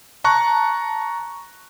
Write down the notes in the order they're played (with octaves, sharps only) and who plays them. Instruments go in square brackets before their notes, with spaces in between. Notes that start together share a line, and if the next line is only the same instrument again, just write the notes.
[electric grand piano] A5 A#5 C#6 F#6